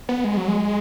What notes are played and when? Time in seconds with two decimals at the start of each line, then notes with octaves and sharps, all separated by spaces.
0.09 B3
0.24 G#3
0.37 F#3
0.48 G#3